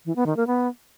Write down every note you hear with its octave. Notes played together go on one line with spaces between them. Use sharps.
E3
B3
D#3
A#3
B3